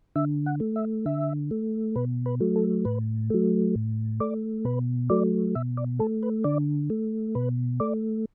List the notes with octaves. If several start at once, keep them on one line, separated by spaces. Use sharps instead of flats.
D3 E5
F#5
A3
E5
D3 E5
A3
B2 B4
B4
F#3 A3
A4
A2 B4
F#3 A3
A2
A3 D5
B2 B4
F#3 A3 D5
B2 E5
D5
A3 A4
B4
D3 D5
A3
B2 B4
A3 D5